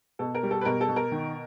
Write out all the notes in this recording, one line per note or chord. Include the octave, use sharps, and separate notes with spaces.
B2 A4
A#4
G3
A4
B4
B2 A#4
A4
B2
A#4
D#3